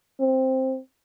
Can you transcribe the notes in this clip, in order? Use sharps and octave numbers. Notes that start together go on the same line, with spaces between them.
C4